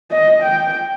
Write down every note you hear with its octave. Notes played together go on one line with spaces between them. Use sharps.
D#5
G5